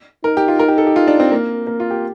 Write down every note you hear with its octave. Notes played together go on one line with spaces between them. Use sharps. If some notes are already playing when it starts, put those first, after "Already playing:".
D#4 A#4
G4
F4
A#4
G4
A4
G4
F4
D4
C4
A#3
A#3
F4
G4